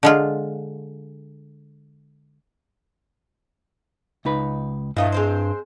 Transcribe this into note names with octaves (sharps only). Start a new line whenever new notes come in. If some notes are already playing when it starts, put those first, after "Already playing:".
D3 G#3 F4
C#2 D#4 B4
G2 A#2 F3 A3 E4 D#5
G#3 C4 C5